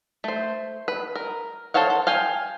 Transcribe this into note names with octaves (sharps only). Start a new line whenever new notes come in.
A3 C5
B4
A#4
A4 C5 C#5 F5 F#5
A4
F5 G5 G#5